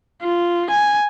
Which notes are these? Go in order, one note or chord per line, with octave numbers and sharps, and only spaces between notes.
F4
G#5